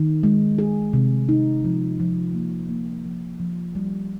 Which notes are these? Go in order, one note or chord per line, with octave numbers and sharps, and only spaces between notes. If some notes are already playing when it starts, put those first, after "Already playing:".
Already playing: D#3
G#3
G#4
C3
D#4
F3
F3
A#3
A#3
F3
F3
G3